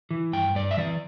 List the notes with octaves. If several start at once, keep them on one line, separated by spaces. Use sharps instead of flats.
E3
G2 G5
G2 D5
E5
E3 D5